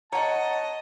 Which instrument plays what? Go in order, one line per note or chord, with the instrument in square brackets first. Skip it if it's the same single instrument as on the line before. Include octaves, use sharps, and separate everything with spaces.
[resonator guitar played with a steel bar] C#5 F#5 [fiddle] D#5 [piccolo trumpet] A5 [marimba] A#5